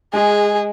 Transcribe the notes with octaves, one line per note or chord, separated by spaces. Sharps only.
G#3 G#4